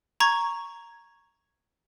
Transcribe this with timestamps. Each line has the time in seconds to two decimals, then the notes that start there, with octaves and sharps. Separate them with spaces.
0.20 A#5 C#6 G#6